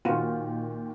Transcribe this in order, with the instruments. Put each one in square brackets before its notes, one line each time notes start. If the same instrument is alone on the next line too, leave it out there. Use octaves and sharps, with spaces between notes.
[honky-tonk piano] A#2 D#3 [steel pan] F4 F#4